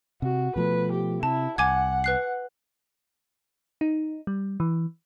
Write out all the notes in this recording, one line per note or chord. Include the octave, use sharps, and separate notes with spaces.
C3 F#4
B2 F3 A3 B4
G4
C3 E4 A5
C2 F#5 G#5 D6 G#6
B4 F#6 C7
D#4
G3
E3